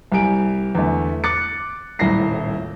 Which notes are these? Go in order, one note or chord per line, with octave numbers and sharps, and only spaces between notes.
C2 G3 G#5 D7
E2 D3 A3
D6 F#6 A6 C#7
D#1 C2 A2 E4 A#6 C7